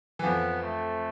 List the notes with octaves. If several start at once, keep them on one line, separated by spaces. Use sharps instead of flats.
E3
F2 F3 B3
A3